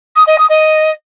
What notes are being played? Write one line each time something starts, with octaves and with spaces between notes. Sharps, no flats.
D#6
D#5
D#6
D#5